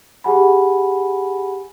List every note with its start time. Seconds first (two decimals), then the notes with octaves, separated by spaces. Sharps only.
0.24 G4 G#4 F#5 G#5 B5